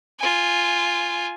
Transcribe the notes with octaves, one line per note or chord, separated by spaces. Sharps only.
F4 G#5